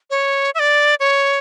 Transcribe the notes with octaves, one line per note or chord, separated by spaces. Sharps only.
C#5
E5
D5
C#5